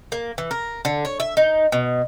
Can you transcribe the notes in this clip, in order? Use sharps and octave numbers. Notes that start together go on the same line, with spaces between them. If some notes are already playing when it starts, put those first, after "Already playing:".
A#3
E3
A#4
D3
C#5
E5
D#4
B2